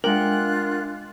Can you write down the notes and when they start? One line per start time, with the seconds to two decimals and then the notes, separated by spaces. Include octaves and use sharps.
0.04 G#3 D4 F4 A#4 F#5 G5 F#6